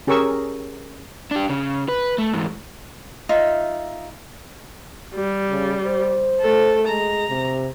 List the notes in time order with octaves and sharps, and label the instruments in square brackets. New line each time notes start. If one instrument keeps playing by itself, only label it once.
[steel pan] C#4 G4 G#4 A#4 C#6 E6
[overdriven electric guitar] D4 G4
C#3
B4
A3
G#2 E3
[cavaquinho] D#4 F4 E5
[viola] G3
[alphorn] C#3
C5
[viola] A3 A4
[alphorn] G#3 [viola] A#5
[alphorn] C3